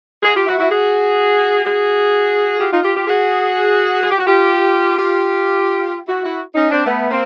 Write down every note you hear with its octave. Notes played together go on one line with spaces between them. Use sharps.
F#4 G#4
F4 G4
E4 F#4
E4 F#4
F#4 G#4
F#4 G#4
F4 G4
D#4 F4
F4 G4
F4 G4
F#4 G#4
G#4
G4
F#4
F4 G4
F4 G4
E4 F#4
E4 F#4
C#4 D#4
C4 D4
A3 B3
A#3 C4